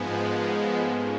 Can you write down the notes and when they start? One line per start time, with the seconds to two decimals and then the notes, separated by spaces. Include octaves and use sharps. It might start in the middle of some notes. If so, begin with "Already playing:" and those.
Already playing: G#2 F3 G#3 B3
0.20 A#4
0.51 A4
0.81 G#2 F3 A#3 C#4 G#4